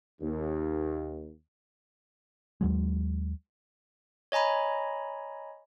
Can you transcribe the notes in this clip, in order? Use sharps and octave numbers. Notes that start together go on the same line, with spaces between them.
D#2
D#2 F#3 G#3
C#5 D#5 G#5 A#5 B5